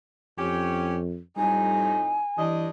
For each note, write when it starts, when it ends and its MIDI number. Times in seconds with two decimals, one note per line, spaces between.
0.38 1.18 41
0.38 0.97 61
0.38 0.97 67
1.37 2.20 41
1.37 2.20 45
1.37 1.98 55
1.37 2.20 63
1.37 2.41 80
2.38 2.69 43
2.38 2.69 52
2.38 2.69 62
2.38 2.69 75